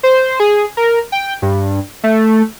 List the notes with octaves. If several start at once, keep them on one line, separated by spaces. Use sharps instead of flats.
C5
G#4
A#4
G5
G2
A3